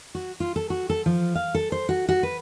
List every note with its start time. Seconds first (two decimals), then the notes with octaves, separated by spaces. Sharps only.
0.15 F#4
0.40 F4
0.56 A4
0.70 F#4
0.90 A4
1.06 F3
1.35 F5
1.54 A4
1.72 C5
1.89 F#4
2.09 F#4
2.23 B4